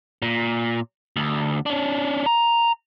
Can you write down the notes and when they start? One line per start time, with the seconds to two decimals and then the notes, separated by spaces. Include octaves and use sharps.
0.22 A#2
1.16 D2
1.66 C#4 D4
2.26 A#5